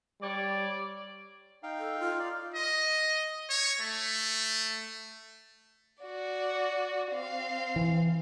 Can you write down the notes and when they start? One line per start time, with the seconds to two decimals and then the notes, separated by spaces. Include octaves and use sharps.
0.21 G3 C#5 D5
1.63 D#4 F5 G5
1.79 A4
1.99 F4
2.19 D5 F5
2.54 D#5
3.49 C#5
3.81 A3
6.02 F#4 D5
7.12 C4 F5
7.76 E3